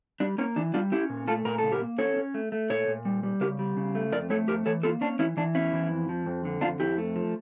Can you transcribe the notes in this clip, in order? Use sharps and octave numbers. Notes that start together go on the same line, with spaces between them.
G3 D4
A#3 C#4
E3 D4
G3 D4 F4
C#4 E4 G4
A#2
A3 F4 A4
A#2 A#4
C#3 A4
G4 A#4
A#3
C#4 A4 C#5
C#4
A3
A3
A#2 A4 C#5
A#2
G3
G3
C#3 G4 A#4
G3
C#3
A3
F2 A#4 D5
A3 A4 C#5
F2 G4 A#4
E3 A4 C#5
A#3 F4 A4
C#4 D4
E3 C#4 E4
E3 D4
E2 C#4 E4
E3
F2
F3
F2
D3
F2 D4 F4
F2 E4 G4
A3
F3